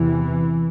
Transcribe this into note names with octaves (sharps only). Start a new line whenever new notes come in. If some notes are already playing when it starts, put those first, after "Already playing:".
Already playing: E2 C3 E3